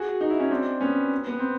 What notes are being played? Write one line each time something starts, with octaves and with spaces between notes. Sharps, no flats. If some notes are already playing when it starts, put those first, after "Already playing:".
Already playing: F#4 G#4
D#4
E4
C#4 D#4
C4 D4
B3 C#4
B3
C4